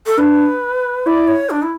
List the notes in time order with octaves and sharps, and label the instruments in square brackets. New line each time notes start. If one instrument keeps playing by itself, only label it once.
[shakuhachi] A4
[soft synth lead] D4 [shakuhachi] B4
[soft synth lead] E4 [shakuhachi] D5
[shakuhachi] C#5
D4
E4